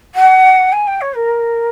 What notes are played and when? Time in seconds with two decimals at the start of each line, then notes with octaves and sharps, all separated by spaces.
0.15 F#5
0.72 G#5
0.87 G5
1.01 C#5
1.16 A#4